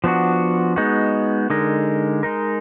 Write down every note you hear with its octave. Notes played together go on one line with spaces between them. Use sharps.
F3 B3 D4 F#4
G#3 B3 D#4 F#4
D3 G#3 D#4 A#4
G#3 D#4 A#4